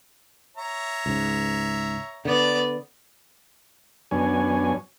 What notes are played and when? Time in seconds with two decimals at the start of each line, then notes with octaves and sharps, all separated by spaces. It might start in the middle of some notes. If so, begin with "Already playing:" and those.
0.57 C#5 E5 A#5
1.06 C#2 G#2
2.25 D3 B3 D5
4.11 F#2 B3 D4 C#5 G#5